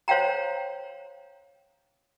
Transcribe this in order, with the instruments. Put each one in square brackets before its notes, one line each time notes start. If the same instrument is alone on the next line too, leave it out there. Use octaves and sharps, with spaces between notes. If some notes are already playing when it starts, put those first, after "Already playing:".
[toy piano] C5 C#5 F5 G5 A#5